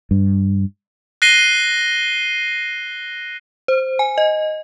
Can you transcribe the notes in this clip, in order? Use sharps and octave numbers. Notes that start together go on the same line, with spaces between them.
G2
F#6 A#6 C7 D#7 G7
C5
G#5
D#5